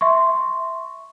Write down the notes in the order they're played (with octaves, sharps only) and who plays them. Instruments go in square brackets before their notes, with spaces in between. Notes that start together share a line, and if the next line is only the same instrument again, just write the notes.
[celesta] E5 C6 C#6